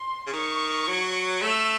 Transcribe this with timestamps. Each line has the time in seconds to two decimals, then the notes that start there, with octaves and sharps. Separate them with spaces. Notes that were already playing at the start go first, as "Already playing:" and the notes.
Already playing: C6
0.27 C#3
0.33 D#3 C#6
0.88 F#3
1.42 A3 E6